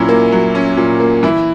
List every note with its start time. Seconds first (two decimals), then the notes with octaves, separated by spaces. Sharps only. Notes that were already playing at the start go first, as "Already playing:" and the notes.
Already playing: A#2 F#3 C#4 E4
0.09 A#3
0.32 F#3
0.55 C#4
0.77 A#2
1.00 A#3
1.23 E3 E4